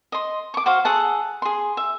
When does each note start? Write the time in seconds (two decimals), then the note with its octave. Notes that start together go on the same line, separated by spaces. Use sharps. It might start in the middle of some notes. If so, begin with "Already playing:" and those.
0.12 D#5 C6
0.54 C#6 D6
0.66 F#4 C5 F5
0.85 G#4 A4 F#5 A5
1.42 G#4 C6
1.77 E5